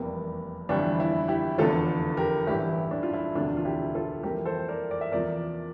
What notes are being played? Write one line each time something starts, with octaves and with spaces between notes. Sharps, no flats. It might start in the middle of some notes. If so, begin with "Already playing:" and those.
Already playing: F1 E2 C3 G3 A#3
G1 F2 E3 G3 D4
E4
E4 G4
F1 E2 D3 A3 F4 A4
G4 A#4
A1 G2 E3 A3 E4 G4
E4
D4
F4
E4
E1 D2 C3 F3 A3 D4 F4
F4
E4 G4
F4 A4
F2 E3 G3 A#3 G4 A#4
A4 C5
A#4 D5
D5
E5
E2 C3 F3 A#3 A#4 D5